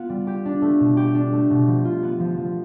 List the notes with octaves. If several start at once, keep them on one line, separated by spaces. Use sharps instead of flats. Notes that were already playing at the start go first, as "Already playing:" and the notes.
Already playing: B3 F4
G3
G4
D4
A3
B2
G4
D4
A3
B2
F3
F4
B3
F3
F3